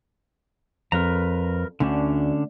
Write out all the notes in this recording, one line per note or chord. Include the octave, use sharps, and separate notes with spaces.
F2 A#4 B4 A#5
D2 D3 C#4 D4